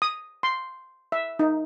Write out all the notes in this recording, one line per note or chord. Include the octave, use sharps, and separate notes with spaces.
D#6
C6
E5
D#4